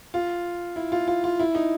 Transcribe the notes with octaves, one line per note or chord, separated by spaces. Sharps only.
F4
E4
F4
F4
F4
E4
D#4